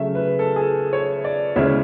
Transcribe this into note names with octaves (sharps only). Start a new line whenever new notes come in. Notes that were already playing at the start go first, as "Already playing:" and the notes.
Already playing: C#3 F#3 A3 E5
B4
A4
G#4
A4
C#5
D5
D2 C#3 G#3 C#4 E4 E5